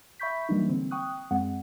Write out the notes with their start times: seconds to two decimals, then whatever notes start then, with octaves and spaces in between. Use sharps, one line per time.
0.19 E5 B5 C#6 G6 B6
0.49 E3 F#3 G3 A#3 D4 D#4
0.69 D3 C4
0.91 G5 C#6 D#6 F#6
1.31 F#2 G#3 C4 F#5